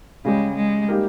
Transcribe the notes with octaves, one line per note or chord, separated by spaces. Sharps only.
C#3 G3 G#3 C#4 G4
G#3
G3 A#3 D#4 G4 A#4